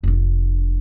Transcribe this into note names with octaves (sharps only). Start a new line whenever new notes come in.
F1 D4